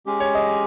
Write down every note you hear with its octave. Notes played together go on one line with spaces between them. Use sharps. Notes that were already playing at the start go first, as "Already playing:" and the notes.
G#3 C#4 G4
C#5
D#5